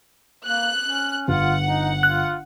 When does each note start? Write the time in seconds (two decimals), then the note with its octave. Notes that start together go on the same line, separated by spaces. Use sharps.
0.45 A#3 F#6
0.84 C#4
1.28 G1 F4 F#5
1.65 D#4
2.03 F4 F#6